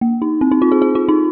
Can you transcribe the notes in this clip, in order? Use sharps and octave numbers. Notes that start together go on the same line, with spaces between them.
A#3
D#4
C4
D#4
F4
G#4
G#4
F4
D#4